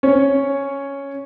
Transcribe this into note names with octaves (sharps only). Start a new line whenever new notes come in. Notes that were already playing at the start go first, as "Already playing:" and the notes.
C#4 C#5